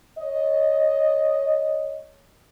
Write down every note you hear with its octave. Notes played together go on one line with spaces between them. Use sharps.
C#5 D#5